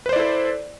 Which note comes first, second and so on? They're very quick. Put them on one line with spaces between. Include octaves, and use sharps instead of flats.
B4 C5 D5 E4 A4